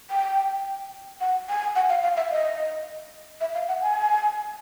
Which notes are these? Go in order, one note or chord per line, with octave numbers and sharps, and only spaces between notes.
G5
F#5
G#5
F#5
F5
F5
E5
D#5
E5
F5
F#5
G#5